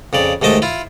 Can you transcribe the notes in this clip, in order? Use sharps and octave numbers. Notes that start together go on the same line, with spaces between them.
F2 C#3 D5
D#2 G#2 A3 D#5 A5 D6
E4 F4